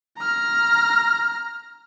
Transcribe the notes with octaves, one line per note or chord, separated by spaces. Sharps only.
A#5 F6